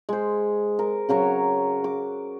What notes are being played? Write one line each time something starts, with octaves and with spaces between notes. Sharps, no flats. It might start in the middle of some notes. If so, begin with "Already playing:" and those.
G#3 C5
A#4
C#3 F#3 A#4 C#5
D6